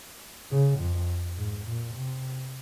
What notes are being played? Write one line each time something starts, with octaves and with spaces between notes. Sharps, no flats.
C#3
F2
G#2
A#2
C3